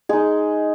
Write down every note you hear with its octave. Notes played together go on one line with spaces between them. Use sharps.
G#3 D#4 G#4